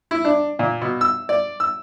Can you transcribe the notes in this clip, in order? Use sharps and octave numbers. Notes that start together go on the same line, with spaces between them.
E4
D4
A#2
B2
E6
D5
E6